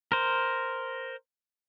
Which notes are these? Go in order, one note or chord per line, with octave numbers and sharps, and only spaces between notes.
A#4 C5